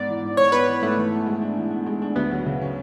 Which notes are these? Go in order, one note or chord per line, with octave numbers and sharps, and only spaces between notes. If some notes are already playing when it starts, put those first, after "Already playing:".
Already playing: G#2 B3 D5
E3
G#2
G#2 C#5
B3 B4
E3
G#2 A3
E3
B3
G#3
D4
E3
B3
G#3
D4
D2 B3
F#3
C#3
C#4